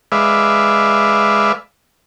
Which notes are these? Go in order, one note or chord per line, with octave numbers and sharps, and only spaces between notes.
G#3 B4 D5 E5 F5